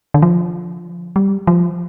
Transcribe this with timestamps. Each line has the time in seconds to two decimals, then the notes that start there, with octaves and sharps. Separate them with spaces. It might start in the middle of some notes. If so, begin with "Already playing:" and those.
0.14 D3
0.22 F3
1.16 G3
1.47 F3